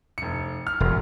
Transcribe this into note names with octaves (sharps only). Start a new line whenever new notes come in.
F1 C#7
F6
E1